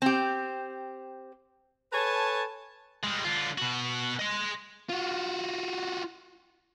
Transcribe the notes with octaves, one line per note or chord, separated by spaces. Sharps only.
C4 G4
A4 B4 C#5 G#5 A5
G3 G#3
D3 F4
B2 F#4
D#5 C6
F4 F#4